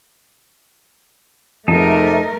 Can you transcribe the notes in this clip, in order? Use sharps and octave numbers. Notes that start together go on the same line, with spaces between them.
F2 G#2 C3 A3 D#4 A#4 A5